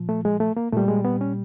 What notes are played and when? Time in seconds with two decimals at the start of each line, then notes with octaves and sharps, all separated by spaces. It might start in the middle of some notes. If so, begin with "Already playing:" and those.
Already playing: A#2 F3
0.09 A3
0.25 G#3
0.40 A3
0.57 A#3
0.73 A#2 G3 A3
0.88 G#3
1.05 B3
1.21 C#4